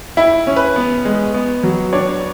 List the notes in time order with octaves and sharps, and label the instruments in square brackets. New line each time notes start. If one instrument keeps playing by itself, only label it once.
[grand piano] E4 E5
C#4
B4
B3
G#3
B3
F#3
D4 C#5